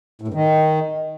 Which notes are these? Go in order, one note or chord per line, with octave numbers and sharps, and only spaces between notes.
A2
G2
D#3